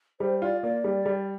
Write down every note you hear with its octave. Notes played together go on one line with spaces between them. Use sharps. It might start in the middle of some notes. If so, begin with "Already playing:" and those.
G3 C5
F4 D5
A#3 D5
G3
G3